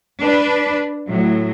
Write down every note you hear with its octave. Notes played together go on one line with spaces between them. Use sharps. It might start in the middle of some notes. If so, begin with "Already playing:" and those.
D4 B4
A2 F#3